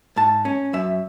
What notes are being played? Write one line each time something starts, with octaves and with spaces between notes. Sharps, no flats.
G#2 A5
C#4
F#2 E5